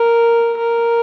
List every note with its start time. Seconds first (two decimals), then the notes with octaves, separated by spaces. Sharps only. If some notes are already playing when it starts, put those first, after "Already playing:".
Already playing: A#4
0.58 A#4